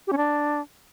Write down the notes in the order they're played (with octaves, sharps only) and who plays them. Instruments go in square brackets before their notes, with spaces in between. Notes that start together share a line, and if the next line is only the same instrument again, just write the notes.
[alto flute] G4
C#4
D4